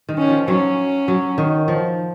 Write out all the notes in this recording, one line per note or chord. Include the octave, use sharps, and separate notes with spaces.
D#3
C#4
F3
F#3 C#4
F#3
D#3
F3